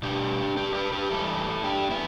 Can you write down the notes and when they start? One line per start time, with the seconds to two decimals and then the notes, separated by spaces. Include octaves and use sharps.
0.03 B2 G3 D4 G4
0.57 D4 G4
0.74 G4 B4
0.92 G4 B4
1.10 E2 E3 G3 E4 A4
1.64 D4 G4
1.90 B3 E4